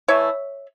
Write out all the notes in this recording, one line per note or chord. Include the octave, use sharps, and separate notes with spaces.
E3 A3 E4 C#5 E5